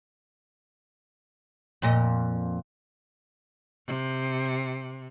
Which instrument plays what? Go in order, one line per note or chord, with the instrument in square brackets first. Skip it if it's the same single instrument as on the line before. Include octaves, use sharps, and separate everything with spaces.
[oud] F2 A#2 D#5
[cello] C3